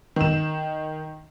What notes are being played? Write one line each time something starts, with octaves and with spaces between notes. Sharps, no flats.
D#3 E7